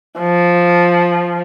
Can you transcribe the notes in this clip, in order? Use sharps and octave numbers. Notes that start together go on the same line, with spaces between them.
F3